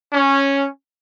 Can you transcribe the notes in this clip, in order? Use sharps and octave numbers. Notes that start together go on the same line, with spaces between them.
C#4